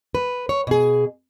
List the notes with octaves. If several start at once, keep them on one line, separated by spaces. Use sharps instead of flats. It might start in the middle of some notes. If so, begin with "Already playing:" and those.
B4
C#5
B2 G#4